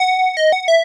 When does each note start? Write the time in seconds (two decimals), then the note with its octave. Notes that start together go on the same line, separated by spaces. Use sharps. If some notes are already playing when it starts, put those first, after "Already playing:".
Already playing: F#5
0.37 D#5
0.52 F#5
0.68 E5